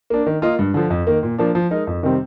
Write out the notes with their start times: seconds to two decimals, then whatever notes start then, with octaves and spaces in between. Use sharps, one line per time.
0.10 A#3 D4
0.26 D#3
0.42 A#3 F4 A#4 D#5
0.59 G2
0.74 D3 F3
0.90 F2
1.07 D#3 A#3
1.23 A#2
1.38 F3 A#3 D4
1.55 F3
1.71 G#3 D#4 A#4
1.87 F2
2.03 C3 D#3 G3 C4